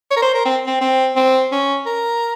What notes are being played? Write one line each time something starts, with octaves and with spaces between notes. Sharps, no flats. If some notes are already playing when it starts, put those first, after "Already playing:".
C#5
A#4
C5
A#4
C4
C4
C4
C4
C#4
A#4